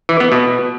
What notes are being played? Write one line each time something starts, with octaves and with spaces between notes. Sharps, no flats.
E3
B3
B2